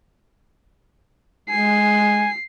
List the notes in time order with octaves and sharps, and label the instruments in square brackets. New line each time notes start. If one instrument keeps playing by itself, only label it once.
[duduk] G#3 [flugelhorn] G#5 [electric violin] C7